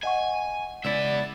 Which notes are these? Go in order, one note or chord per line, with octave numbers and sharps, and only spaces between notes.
D#5 F#5 G#5 C#6
C#2 B3 E4 D5 E5